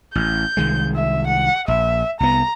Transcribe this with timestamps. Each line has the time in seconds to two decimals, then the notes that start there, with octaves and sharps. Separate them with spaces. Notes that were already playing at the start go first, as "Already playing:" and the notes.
0.15 A1 G6
0.57 C2 D#3 G#3
0.96 E5
1.27 F#5
1.68 A#1 E5
2.20 C2 B3 A#5